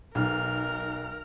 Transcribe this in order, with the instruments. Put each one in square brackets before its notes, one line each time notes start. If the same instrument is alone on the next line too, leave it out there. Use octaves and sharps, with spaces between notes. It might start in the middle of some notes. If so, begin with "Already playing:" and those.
[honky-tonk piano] B1 D#4 [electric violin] A#4 F6